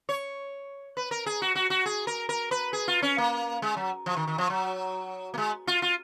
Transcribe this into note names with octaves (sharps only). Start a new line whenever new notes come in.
C#5
B4
A#4
G#4
F#4
F#4
F#4
G#4
A#4
A#4
B4
G#4
F4
C#4
A#3
G#3
F#3
F3
D#3
D#3
F3
F#3
A#3
G#3
F4
F4